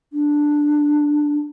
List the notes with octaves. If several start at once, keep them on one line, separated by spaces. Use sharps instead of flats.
D4